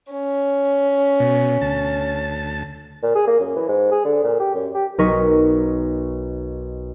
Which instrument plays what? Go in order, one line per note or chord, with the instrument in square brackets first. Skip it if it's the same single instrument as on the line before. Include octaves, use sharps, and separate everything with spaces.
[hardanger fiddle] C#4
[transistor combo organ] B2
D2 A5
[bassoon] A#2
G#4
A#3
F#2
E3
G#2
G#4
D3
A#2
G4
F#2
G4
[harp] B1 D#4 A#4 D#5 C#6 B6